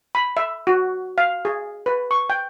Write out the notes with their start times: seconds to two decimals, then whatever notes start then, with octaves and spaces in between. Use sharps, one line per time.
0.15 B5
0.37 E5
0.67 F#4
1.18 F5
1.45 G#4
1.86 B4
2.11 C#6
2.30 G5